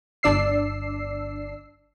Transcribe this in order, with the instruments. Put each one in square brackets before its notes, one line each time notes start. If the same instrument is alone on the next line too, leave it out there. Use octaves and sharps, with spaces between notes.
[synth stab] G1 D4 D5 E6 C7